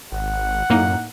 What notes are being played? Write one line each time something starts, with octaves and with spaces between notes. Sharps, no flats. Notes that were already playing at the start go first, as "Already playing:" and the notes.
G#1 F#5
F#2 A2 A#3 D#4